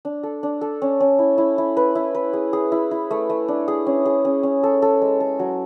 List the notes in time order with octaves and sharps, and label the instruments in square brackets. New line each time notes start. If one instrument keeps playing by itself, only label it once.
[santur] D4
A4
D4
A4
C#4
C#4
E4
E4
E4
B4
E4
B4
G#4
G#4
E4
E4
A3
A3
D4
G#4
C#4
G#4
C#4
C#4
A4
A4
G#3
A4
F#3